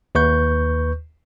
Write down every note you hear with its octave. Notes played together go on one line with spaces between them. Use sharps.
D#2 B4 C#6 G6